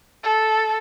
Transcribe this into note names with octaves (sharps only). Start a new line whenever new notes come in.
A4